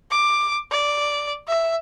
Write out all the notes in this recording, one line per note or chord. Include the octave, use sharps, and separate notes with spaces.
D6
D5
E5